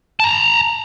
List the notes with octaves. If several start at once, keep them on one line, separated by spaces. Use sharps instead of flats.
A5 A#5